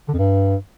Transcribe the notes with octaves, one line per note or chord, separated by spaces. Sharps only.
D3
F2
G2